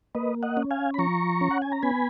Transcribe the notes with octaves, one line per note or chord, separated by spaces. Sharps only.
A#3 B4 D#5
D#5 F#5
C#4
F5 G#5
B5
F3 A#5 C#6
C#4
F#5
G#5
A#5
B3 G#5 B5